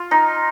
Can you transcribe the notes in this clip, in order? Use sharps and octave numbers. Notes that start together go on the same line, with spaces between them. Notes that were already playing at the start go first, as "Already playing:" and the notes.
Already playing: F4
D#4